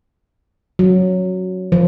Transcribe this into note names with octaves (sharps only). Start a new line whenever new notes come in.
F#3
F3